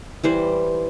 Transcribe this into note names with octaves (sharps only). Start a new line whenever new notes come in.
E3 G3 C5